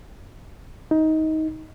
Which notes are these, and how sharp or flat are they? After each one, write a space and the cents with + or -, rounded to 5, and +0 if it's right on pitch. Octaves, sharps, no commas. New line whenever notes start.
D#4 +20